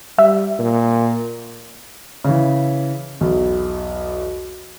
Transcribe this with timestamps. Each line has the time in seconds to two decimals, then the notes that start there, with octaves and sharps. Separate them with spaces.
0.18 G3 E5
0.59 A#2
2.25 C#3 E3
3.21 B1 E2